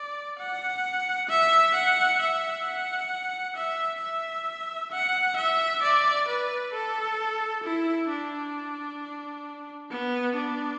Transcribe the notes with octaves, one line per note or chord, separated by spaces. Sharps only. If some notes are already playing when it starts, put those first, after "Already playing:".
Already playing: D5
F#5
E5
F#5
E5
F#5
E5
E5
F#5
E5
D5
B4
A4
E4
D4
B3
D4